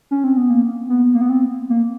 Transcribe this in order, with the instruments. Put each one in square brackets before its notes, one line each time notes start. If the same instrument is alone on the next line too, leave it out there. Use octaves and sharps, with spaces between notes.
[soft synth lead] C#4
C4
B3
A#3
B3
A#3
B3
C4
A#3